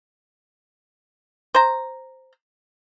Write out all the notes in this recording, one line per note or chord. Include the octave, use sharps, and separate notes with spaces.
C5 A#5